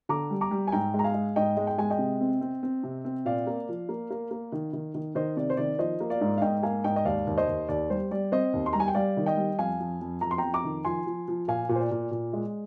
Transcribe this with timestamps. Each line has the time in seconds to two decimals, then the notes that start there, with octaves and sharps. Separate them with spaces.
0.09 D3 A#5 D6
0.30 G3
0.41 A#5 D6
0.51 G3
0.67 G#5
0.72 G#2 G5 A#5
0.94 G#3
0.99 A#5
1.04 F5 G#5
1.14 G#3
1.36 G#2 D#5 G5
1.57 G#3
1.67 G5
1.78 G#3 G#5
1.90 D#5 G5
1.99 C3
2.21 C4
2.41 C4
2.63 C4
2.84 C3
3.05 C4
3.25 A#2 D5 F5
3.47 A#3
3.69 F3
3.89 A#3
4.11 A#3
4.31 A#3
4.52 D#3
4.73 D#3
4.94 D#3
5.15 D#3 C5 D#5
5.37 C3 D5
5.50 C5
5.57 D#3 D5
5.79 F3 C5 D#5
6.00 A#3
6.10 D5 F5
6.21 G#2
6.38 F5
6.42 G#2 D#5 G5
6.63 A#3 F5 G#5
6.84 G#2 D#5 G5
6.96 D#5
7.05 D#2 D5 F5
7.27 D#2
7.37 C5 D#5
7.48 D#2
7.69 D#2 D5
7.90 G3 C5
8.11 G3 D5
8.32 C4 C5 D#5
8.53 D#2
8.66 C6
8.73 G3 A#5
8.80 G#5
8.88 G5
8.95 G3 D5 F5
9.17 D#3
9.26 D#5 G5
9.37 G3
9.59 F2 F5 G#5
9.80 F2
10.01 F2
10.21 F2 A#5
10.31 C6
10.38 G5 A#5
10.44 F2
10.54 A#5 D6
10.64 D#3
10.85 F3 G#5 C6
11.06 F3
11.28 F3
11.48 A#2 F5 G#5
11.69 A#2
11.75 C5
11.80 D5
11.91 A#2
12.11 A#2
12.33 G#3